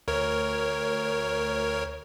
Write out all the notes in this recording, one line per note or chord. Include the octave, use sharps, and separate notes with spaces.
D2 A#4 C#5